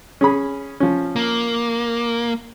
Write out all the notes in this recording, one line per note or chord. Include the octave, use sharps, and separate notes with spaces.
C#4 G#4 B5
F3 C#4
A#3